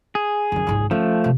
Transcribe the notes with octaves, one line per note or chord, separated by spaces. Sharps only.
G#4
F#2 C#3
G#1 C#2
F3 A3 C#4
C3